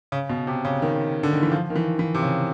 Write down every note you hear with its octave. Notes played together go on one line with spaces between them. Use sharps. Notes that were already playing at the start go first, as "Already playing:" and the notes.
C#3
B2
C3
C#3
D#3
D3
D#3
E3
F3
D#3
E3
E3
C3
C#3